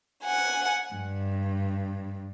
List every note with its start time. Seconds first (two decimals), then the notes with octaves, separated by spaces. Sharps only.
0.23 F#5 G#5
0.96 G2